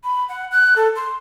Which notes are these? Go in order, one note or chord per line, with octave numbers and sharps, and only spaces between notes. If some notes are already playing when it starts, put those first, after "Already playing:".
B5
F#5
F#6
A4
C6